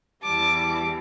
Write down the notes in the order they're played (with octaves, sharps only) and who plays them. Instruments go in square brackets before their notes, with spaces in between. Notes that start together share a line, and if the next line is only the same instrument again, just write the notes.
[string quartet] E2 E3 G3 A5 D6